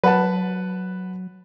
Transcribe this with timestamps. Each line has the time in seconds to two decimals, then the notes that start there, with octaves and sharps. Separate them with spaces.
0.04 F#3 B4 F#5 A5